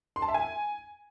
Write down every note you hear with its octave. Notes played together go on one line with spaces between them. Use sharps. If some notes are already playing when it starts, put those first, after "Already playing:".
C6
A5
E5
G#5